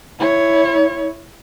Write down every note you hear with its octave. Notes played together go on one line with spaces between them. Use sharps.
E4 C#5